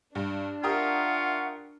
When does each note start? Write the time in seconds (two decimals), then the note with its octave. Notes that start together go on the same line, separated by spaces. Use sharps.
0.15 G2 D4
0.63 F4 G4 A#4 E5 F#5 C#6 D#6